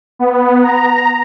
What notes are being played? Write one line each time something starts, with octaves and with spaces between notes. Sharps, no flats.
B3
A#5